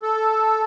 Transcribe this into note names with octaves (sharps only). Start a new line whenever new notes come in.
A4